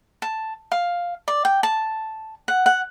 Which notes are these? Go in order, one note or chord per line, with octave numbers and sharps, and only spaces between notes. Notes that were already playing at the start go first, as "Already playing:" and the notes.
A5
F5
D5
G5
A5
F#5
F#5